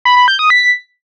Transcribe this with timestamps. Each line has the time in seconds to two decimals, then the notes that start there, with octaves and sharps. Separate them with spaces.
0.05 B5
0.17 B5
0.28 G6
0.39 D#6
0.50 B6